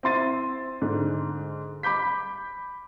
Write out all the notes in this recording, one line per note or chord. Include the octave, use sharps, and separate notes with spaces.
C4 E4 C6 A6 D#7
G#2 D3
B5 D6 G6 B6